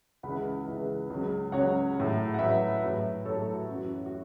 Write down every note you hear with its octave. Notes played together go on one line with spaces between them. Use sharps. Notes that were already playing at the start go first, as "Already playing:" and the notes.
C#2 C#3 E3 F#5 B5
C#2 C#3 E3
C#2 C#3 F#3
C#2 C#3 F#3 C#5 F#5
A2 F#3
F#5
A2 F#3 B4 E5
A2 F#3
A2 F#3 A4 C#5
A4
F#4
F#2 E3
F#4
F#4